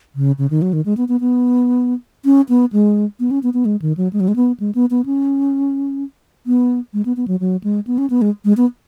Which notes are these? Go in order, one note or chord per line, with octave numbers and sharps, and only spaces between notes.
C#3
C#3
D#3
F#3
D#3
G#3
B3
B3
B3
C#4
B3
G#3
B3
C#4
B3
B3
G#3
D#3
F#3
G#3
F#3
G#3
B3
G#3
B3
B3
C#4
B3
G#3
B3
B3
F#3
F#3
G#3
B3
C#4
B3
G#3
G#3
B3